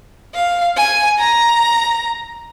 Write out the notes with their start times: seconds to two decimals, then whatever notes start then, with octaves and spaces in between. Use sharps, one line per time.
0.35 F5
0.77 G#5
1.19 A#5